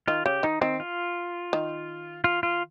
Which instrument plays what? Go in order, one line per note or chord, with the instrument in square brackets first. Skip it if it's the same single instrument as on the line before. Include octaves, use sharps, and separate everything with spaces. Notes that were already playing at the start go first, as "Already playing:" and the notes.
[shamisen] D#3 [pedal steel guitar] F4
[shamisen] C#3 [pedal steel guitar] G4
[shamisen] D#3 [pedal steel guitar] D#4
[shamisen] D#3 [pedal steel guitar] C4
[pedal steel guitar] F4
[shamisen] D#3
[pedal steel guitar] F4
F4